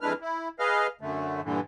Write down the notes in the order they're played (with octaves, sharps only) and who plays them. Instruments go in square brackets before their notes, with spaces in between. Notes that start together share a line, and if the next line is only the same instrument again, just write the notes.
[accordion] F2 G#3 D4 E4 B4 F6
E4
G#4 B4 D#5 F5 F6
F#2 D3 A3
G2 A#2 D3 E3